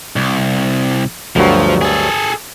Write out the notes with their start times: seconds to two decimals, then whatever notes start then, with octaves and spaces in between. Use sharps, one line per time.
0.16 C2
1.36 D2 G2 F3 F#3
1.82 G#4 A4